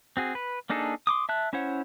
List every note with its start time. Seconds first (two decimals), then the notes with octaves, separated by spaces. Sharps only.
0.17 C4 F#4 G#4
0.35 B4
0.70 A#3 D4 D#4 G#4 A4
1.07 C6 D6 D#6
1.29 E5 A5 F#6
1.53 C#4 E4 C5 C#5 F#5